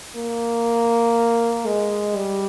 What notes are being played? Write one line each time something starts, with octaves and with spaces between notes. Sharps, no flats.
A#3
G#3
G3